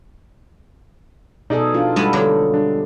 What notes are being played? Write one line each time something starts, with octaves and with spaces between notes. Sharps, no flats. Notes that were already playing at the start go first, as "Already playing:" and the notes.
B2 D#4 G#4 A4 D5
D4 F4
G2 G3 G#3 B3 A4 A5
D3 F#3 G4
G3 D4